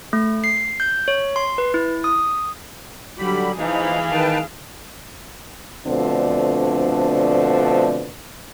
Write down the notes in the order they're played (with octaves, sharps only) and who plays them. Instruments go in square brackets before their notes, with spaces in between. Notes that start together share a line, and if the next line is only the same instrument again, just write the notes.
[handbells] A3
C7
G6
C#5
C6
B4
E4
D#6
[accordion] D3 G3 B5 [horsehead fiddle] F#3 G4
[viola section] E3 B5 [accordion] F3 D#4 [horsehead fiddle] G#4 F5
[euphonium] D#3 [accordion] B4 G5 A5
[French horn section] B2 D3 F3 A3 C4 D4